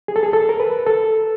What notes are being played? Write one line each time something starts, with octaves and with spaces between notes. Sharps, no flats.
G#4
A4
G#4
A4
A#4
B4
A4